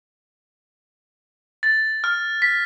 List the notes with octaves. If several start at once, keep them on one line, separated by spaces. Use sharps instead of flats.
A6
F6
B6